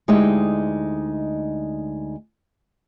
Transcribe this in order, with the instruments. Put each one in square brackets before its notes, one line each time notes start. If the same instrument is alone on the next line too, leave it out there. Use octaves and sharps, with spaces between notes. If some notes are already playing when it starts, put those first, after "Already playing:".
[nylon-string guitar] D2 G#3 D#4 E4 G4 G5